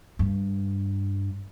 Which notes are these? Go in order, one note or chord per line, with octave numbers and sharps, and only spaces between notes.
G2